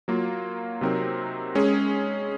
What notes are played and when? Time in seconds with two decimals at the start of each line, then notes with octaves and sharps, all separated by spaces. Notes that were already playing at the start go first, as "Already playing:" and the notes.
0.08 F#3 A#3 F4
0.81 C3 F#3 C4 D#4 A#4
1.55 G#3 C#4 G#4